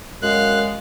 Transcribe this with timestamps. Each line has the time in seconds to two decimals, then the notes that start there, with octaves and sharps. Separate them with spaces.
0.23 F#2 G#3 F5 F#6